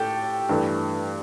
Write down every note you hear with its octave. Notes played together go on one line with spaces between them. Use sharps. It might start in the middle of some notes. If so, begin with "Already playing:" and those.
Already playing: A2 G4 A4
G2 E3 A3